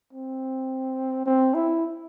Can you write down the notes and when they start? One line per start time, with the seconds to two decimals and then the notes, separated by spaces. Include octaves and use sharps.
0.13 C4
1.26 C4
1.54 E4